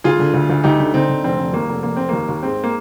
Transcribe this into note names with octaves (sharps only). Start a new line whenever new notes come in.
D2 F4 G#4
D3
D2
D2
D2 D#4 G4
D3
D3 C4 D#4
D3
F1 C4
F1
D#2 A#3
F1
F1 A#3
F1 C4
D#2 A#3
D#2
G#2 C4
A#3